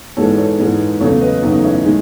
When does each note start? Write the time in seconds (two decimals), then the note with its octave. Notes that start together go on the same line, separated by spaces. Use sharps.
0.17 G#2 E3 G#3 A4 C#5
0.38 A4 C#5
0.59 G#2 E3 G#3
1.00 E2 C#3 F#3 A3 A4 C#5
1.21 B4 D#5
1.42 E2 C#3 F#3 A3 D#4 F#4
1.64 C#4 E4
1.84 D#3 G#3